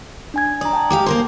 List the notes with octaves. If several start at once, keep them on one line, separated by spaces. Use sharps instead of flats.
D4 G#5 G#6
D5 A#5 D#6
G5 A5
G#3 G4 F5 D6
A#3 A#4 C5